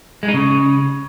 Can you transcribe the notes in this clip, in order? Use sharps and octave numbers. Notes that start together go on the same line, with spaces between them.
G#3
D#4
C#3